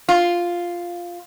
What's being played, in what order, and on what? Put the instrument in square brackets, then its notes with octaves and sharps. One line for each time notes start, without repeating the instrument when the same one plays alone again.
[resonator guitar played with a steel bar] F4